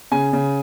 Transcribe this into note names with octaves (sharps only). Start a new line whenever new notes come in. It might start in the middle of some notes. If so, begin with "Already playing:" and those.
C#3 G#5
C#3